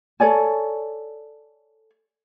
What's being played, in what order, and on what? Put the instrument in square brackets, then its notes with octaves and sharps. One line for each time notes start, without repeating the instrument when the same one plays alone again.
[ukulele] A4 C#5 D5 G#5